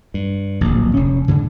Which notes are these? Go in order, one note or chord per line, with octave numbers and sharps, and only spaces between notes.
G2
D1 A#1
F1 C#4
G#2 D3